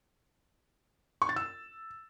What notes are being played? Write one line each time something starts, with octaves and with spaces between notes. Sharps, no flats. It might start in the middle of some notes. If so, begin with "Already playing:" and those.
C#6
A6
E6